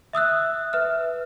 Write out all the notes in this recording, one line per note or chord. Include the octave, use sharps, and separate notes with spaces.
E5 D#6 E6 F#6
B4 E5 F6